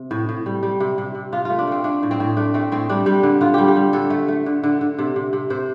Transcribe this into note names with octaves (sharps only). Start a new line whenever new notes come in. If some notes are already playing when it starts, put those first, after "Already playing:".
Already playing: C3
A2
A2
G3
G3
C3
C3
C3
C3 F4
A3 F4
D4
A3 C4
A3 D4
A2
C4
A2
A3 D4
A3 C4
A2 C4
G3 D4
G3
D3
D3 F4
G3 G4
G4
G3
D3 A4
A3
A3
D3
D3
D3
C3
C3
C3
C3 C5